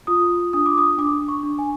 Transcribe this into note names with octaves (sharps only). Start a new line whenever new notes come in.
F4 D#6
D4 D#6
D6
D#6
D4 D6
C#6
D4
G#5